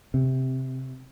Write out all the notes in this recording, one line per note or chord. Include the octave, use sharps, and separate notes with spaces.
C3